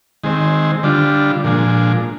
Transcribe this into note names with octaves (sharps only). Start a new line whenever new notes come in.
D#3 G#3 C4
D3 G3 D4 F4
A#2 F3 G#3 D4